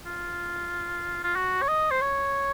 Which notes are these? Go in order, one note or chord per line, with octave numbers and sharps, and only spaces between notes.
F4
F4
F#4
C#5
D#5
C5
C#5